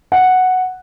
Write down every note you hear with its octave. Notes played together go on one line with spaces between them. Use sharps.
F#5